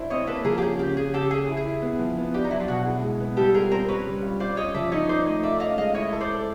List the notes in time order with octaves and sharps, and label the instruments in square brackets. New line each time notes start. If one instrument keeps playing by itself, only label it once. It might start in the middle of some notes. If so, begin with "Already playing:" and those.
Already playing: [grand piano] D4 E4 C5
[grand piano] C4 [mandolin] C#5 D#5
[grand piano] A#3 [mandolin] A4 B4
[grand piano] F3 [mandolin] G#4 A#4
[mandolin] G4
[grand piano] C#4 [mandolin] G#4
[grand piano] C#3 [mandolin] G4
[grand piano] C#3 [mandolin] G#4
[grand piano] C#3 [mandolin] G4 A4
[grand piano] C#4 [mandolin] G#4
[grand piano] E4
[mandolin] G#4
[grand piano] E4
B3
F3
B3
[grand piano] D4 [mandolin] G4
[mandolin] D#4
[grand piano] F#3 [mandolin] E4
[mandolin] F4
[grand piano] B2 [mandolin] F#4
[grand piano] E4 [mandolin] G#4
[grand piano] G#3
B3
[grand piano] G3 [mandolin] G4 A4
[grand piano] F4 [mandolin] G#4 A#4
[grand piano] C4 [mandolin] A#4 C5
[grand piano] C#4 [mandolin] B4 C#5
[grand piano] G3
F4
[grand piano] F4 [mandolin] C5 D5
[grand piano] C#4 [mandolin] C#5 D#5
[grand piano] F3 [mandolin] D5 E5
[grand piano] D#4 [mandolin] C#5 D#5
[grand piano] D#4 [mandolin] C5 D5
[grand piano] A3 [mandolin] C#5 D#5
[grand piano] F4 [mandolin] D5 E5
[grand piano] C#4 [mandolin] D#5 F5
[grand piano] G#3 [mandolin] D#5 F5
[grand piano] E4 [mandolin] C#5 D#5
[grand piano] A4
[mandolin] C5 D5
[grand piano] A4